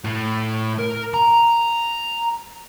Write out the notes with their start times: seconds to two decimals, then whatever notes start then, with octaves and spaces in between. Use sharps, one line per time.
0.04 A2
0.79 A#4
1.14 A#5